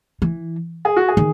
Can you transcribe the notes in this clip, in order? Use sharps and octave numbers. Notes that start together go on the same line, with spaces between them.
E3
G#4
F#4
G#4
D#3